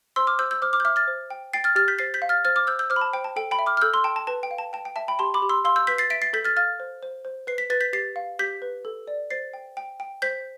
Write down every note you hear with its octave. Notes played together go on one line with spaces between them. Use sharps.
C5 C6 E6
D6 F6
C5 E6 G6
E6 G6
C5 D6 F6
D6 F6
G6
E5 D6 F6
F6 A6
C5
G5
G5 A6 C7
F6 A6
G4 F6 A6
G6 B6
C5 A6 C7
G6 B6
F5
F6 A6
C5 F6 A6
D6 F6
C5 E6 G6
E6 G6
C5 D6 F6
B5
A5
C5 G5
A5
A4 G5
G5 B5
E5
D6 F6
F6
A4 E6 G6
C6 E6
G5 A5
A5
B4 A5
G5
F5
A5
G5 A5
G5
E5 A5
G5 B5
G4 A5 C6
B5 D6
G4
C6 E6
F5 C6 E6
E6 G6
B4 G6 B6
A6 C7
E5 B6 D7
A6 C7
A4 G6 B6
F6 A6
F5 F6 A6
C5
C5
C5
B4 C7
B6
B4 A6
G6 B6
G4 A6 C7
F5
G4 G6 B6
B4
A4
D5
C5 A6 C7
G5
G5
G5
C5 G6 B6